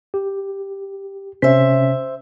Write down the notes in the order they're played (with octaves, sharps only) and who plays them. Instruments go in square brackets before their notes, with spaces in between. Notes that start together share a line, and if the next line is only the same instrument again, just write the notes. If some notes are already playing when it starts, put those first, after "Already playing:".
[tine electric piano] G4
[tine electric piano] C3 C#4 B6 [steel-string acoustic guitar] C5 E5